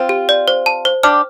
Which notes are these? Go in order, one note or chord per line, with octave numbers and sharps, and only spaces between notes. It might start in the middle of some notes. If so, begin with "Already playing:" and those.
Already playing: C4 F4
G4
D5
C5
A5
C5
D4 G4 F6